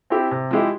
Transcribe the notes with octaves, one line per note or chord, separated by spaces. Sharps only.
C4 E4 G4
C3
F3 G#3 E4 G4